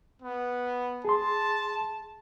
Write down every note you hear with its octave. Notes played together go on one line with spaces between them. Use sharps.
B3
G#4 A5 C6